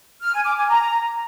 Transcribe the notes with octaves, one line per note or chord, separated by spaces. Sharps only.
F6
G#5
D6
G#5
A#5